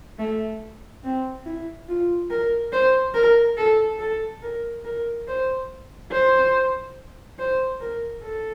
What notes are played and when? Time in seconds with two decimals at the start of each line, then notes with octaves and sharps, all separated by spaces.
0.19 A3
1.04 C4
1.45 E4
1.88 F4
2.30 A#4
2.73 C5
3.14 A#4
3.57 A4
3.99 A4
4.42 A#4
4.85 A#4
5.27 C5
6.12 C5
7.39 C5
7.81 A#4
8.23 A4